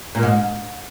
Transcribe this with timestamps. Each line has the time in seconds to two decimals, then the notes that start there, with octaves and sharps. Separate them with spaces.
0.15 A#2
0.23 G#2